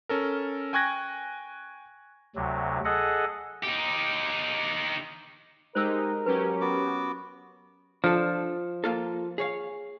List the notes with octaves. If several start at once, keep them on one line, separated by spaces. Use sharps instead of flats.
C#4 A4 A#4
G5 G#5 C#6 F#6 G#6 A#6
D2 C3 F#3
G#4 A4 D#5 F#5
D#4 G4
G#3 D#4 G4 A#4 C5 E6
F#3 C#4 G4 B4
B3 F#4 D6
F3 D4 A4
A#3 F4 A4
G#4 C#5 F5